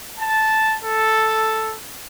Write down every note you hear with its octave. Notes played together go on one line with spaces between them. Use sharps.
A5
A4